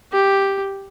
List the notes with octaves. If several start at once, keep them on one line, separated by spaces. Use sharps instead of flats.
G4